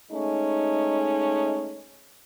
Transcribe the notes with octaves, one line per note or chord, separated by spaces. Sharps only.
G#3 A3 C#4 D#4